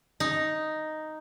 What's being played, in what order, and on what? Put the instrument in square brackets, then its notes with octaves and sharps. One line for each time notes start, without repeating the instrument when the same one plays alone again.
[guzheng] D#4